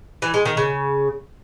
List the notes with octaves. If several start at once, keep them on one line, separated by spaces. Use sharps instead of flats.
E3
G#3
D#3
C#3